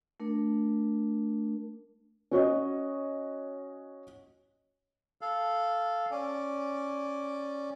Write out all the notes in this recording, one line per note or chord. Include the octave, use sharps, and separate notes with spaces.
A3 D4 A#4
C#4 F#4 C#5 D#5
A4 F5
C#4 D5